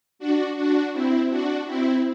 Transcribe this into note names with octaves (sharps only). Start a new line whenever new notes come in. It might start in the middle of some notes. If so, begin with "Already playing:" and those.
D4 F#4
D4 F#4
C4 E4
D4 F#4
C4 E4